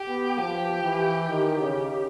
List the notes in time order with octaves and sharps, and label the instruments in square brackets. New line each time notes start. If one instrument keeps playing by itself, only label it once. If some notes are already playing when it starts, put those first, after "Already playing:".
Already playing: [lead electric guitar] G4
[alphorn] B3
[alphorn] F3 [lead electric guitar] G4
[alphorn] E3
D#3
C#3